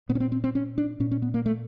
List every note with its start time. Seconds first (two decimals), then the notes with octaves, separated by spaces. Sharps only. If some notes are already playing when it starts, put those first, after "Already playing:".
0.09 A#2 B3
0.15 C#4
0.20 C4
0.32 C4
0.44 C4
0.55 C#4
0.78 D4
1.00 A#2 C#4
1.11 C#4
1.22 B3
1.34 A#3
1.46 A3